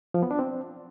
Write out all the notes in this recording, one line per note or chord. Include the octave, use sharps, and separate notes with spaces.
F3
B3
D4
C4